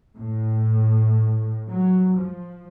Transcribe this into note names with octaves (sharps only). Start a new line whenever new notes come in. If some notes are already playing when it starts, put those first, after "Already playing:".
A2
F#3
F3